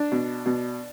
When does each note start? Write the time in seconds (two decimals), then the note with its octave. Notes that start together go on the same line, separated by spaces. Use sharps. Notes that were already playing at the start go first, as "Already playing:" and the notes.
Already playing: D4
0.12 B2
0.46 B2